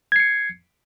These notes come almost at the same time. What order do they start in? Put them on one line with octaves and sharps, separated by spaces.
G#6 C7 C#7